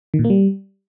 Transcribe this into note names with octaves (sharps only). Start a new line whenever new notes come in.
D#3
A#2
A#3
G3